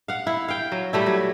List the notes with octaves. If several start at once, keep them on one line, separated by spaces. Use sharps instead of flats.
F5 F#5
E4
F5 G5
F#3
G3 A3 E4
F#3